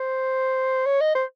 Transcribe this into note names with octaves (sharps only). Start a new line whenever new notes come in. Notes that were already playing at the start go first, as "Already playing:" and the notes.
Already playing: C5
C#5
D#5
C5